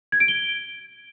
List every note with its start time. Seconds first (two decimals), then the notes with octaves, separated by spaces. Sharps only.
0.12 G#6
0.20 D7
0.28 G7